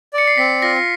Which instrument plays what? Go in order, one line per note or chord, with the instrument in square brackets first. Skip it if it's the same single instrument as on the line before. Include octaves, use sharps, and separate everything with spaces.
[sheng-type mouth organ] D5 [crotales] C#7
[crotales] C7
[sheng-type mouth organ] C4 [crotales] B6
[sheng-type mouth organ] F4 [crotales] A#6
[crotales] A#6